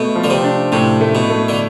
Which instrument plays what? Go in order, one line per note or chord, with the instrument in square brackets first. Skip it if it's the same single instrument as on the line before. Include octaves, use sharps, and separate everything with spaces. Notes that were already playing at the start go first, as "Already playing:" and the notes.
Already playing: [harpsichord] B2 [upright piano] A3
[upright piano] F3
[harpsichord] D3
C3
[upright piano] D4
[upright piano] A2 [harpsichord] C3
[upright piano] A3
[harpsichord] B2
[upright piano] A3
[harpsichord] D3